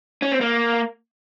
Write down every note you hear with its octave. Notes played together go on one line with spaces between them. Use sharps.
C#4
C4
A#3